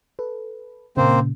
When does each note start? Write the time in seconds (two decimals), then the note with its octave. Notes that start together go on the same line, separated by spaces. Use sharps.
0.19 A4 B4
0.97 A#2 C#3 A#3 C4 C5